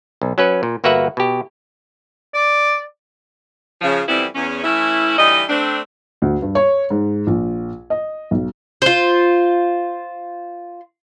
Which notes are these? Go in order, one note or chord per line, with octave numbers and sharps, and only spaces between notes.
B1
F#3 C#4 B4
A#2
G1 A#3 F#4 B4 E5 F#5
B2 G4
D5
C#3 F3
F2 E3 G3 B3 C4 E4
E2 C#4
E3 A3 C#4 E4
D2 E3 G3 D#4 D#5
A3 C4 D4
D2
G2
C#5
G#2
A#1
D#5
B1
F4 C5